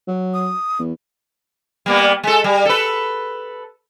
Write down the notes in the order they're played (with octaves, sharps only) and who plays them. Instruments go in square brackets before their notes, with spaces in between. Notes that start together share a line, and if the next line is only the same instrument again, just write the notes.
[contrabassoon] F#3
[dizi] D#6
[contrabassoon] E2
[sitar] G3 A#3 B3
G#3 A4
G3
A4 B4